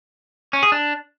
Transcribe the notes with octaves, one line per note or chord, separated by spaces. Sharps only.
C#4
G#4
D4